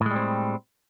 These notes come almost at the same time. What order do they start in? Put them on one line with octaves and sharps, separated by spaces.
A2 G#3 G3 C4